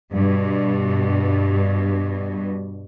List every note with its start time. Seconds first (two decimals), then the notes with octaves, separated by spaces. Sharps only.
0.13 G2 B2